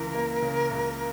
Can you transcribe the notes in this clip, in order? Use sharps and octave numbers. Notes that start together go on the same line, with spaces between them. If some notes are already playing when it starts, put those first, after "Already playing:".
Already playing: C#2 C#3 E3 A#4
A#3
C#3
C#2